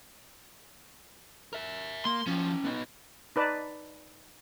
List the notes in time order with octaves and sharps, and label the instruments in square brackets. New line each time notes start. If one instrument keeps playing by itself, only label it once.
[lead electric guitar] A#4 E5
[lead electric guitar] A#3 [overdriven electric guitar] C6
[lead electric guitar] F3 [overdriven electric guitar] A#3 C#4
[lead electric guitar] B3 D#4
[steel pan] D#4 B4 D5 A5